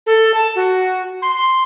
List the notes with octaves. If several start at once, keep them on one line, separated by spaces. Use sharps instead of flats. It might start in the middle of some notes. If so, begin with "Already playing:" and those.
A4
A5
F#4
C6
C6